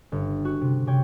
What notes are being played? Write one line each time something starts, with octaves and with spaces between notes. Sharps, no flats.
G1
F#4
C3
C3 C#5 G5 D6